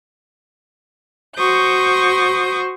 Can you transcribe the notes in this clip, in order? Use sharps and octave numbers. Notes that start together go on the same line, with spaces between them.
F#4 C5 C#6 D#6 G6